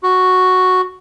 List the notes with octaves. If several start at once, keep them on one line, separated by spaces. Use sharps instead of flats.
F#4